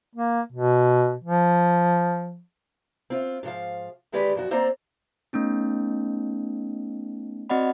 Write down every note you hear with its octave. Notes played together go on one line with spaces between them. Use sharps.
A#3
B2
F3
C4 F4
G#2 F3 F5
D2 D#3 G#3 G4 B4 D5
F#2 F3 F#4
A#3 C4 C5 D5 A#5
A3 B3 C#4 D#4
C4 F#4 D5 D#5 F#5 B5